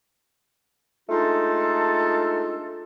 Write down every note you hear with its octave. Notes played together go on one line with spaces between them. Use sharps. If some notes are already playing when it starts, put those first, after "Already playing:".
G#3 A3 D4 D#4 F4 A4